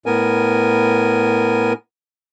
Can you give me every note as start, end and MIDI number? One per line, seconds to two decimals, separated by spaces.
0.06 1.73 45
0.06 1.73 59
0.06 1.73 70
0.06 1.73 80